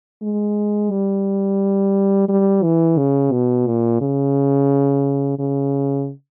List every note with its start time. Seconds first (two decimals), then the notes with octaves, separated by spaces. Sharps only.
0.22 G#3
0.91 G3
2.29 G3
2.63 E3
2.98 C#3
3.32 B2
3.67 A#2
4.01 C#3
5.39 C#3